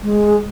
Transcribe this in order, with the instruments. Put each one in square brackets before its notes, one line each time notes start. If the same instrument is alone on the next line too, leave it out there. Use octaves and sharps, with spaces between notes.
[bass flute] G#3